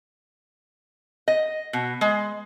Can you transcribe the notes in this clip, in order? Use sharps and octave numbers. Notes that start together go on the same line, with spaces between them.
D#5
B2
G#3